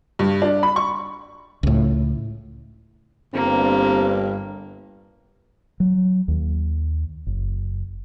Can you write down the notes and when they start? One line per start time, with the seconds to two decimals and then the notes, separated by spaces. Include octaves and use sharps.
0.19 G2
0.42 D4
0.63 B5
0.76 C#6
1.63 C#2 A2
3.34 G1 G2 A#3 C4
5.80 F#3
6.28 D#2
7.27 F#1